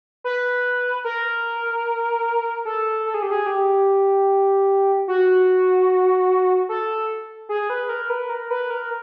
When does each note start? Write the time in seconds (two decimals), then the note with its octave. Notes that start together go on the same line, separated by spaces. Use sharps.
0.24 B4
1.04 A#4
2.65 A4
3.06 A4
3.14 G#4
3.22 G4
3.31 G#4
3.46 G4
5.08 F#4
6.69 A4
7.49 G#4
7.70 B4
7.89 A#4
8.10 B4
8.30 A#4
8.50 B4
8.70 A#4